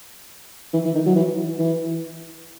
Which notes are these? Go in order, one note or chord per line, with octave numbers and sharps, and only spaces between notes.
E3
E3
D#3
F#3
E3
E3